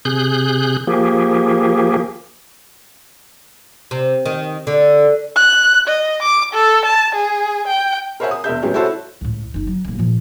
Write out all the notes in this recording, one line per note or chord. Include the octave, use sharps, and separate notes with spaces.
C3 G#4 F#6 G6
F3 A#3 G4 G#4
C3
D#3
D3
F#6
D#5
D6
A4
A5
G#4
G5
A#4 C5 C#5 E5 F#5 G#5
D#6
E1 A#4 E5 G6
A2 F#3 G#3 B3 C#4 G4
E4 F#4 A4 C5 C#5 E5
C#2 A2
F#1 D#4
F#3
D#1 A#3
A#2 F3